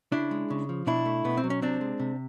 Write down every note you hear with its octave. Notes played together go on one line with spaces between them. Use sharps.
C#3 D4 E4
G#3
C#3
F3
B2 D4 E4
A3
B2 B3
C4
F#3
C#4
C3 C4 D4
G#3
C3